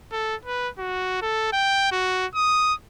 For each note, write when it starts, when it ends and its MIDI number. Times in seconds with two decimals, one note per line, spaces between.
0.12 0.35 69
0.45 0.69 71
0.78 1.19 66
1.22 1.51 69
1.53 1.89 79
1.92 2.27 66
2.35 2.74 87